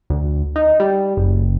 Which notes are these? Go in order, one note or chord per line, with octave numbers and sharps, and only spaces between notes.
D2
D#4
G3
F#1